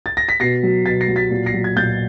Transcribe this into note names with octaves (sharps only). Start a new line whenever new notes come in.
A6
A#6
B6
B2 A#6 C7
F#3
B2 A6 B6
A#6 C7
F#3
A6 B6
A#2
A#6 C7
F#3
G#6
A#2 G6 A6